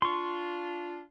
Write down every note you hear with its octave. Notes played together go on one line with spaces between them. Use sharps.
D4 F4 C6 C#6